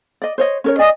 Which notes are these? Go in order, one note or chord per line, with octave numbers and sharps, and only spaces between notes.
D5 D#5
C5 C#5 D#5
C#4 A#4 C#5
D5 D#5 G#5